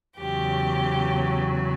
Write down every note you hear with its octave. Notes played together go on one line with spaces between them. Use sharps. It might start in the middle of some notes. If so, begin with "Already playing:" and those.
E2 C#3 F#3 G4